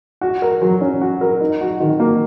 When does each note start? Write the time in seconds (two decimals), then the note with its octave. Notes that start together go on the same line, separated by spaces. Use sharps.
0.21 F#4
0.42 A#4
0.61 F#3
0.81 C#4
1.01 F#4
1.21 A#4
1.41 D#4
1.61 F#4
1.80 D#3
2.00 A#3